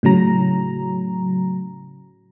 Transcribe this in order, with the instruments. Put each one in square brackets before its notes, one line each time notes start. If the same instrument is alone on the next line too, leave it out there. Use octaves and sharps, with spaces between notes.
[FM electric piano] A2 C#3 F#3 A#5